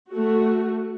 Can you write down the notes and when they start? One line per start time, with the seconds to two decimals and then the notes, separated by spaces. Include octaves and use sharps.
0.11 A3 F#4